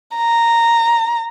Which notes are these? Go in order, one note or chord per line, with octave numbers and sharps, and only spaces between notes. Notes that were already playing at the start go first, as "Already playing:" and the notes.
A#5